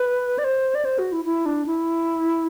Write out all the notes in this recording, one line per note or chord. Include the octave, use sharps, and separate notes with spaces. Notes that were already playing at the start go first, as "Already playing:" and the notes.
Already playing: B4
D5
C5
D5
C5
F#4
E4
E4
D4
E4